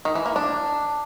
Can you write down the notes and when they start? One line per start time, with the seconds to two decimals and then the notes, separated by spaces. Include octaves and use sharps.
0.05 D#3
0.15 E3
0.26 A#3
0.36 D4